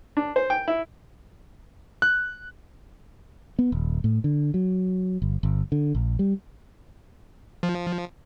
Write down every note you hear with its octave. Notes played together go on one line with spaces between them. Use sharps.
D4
C5
G5
E4
F#6
B3
D#1
A2
D3
F#3
G1
G1
D3
A#1
G3
F3